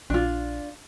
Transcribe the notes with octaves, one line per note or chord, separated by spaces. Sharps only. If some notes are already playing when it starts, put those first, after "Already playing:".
A#1 D4 F4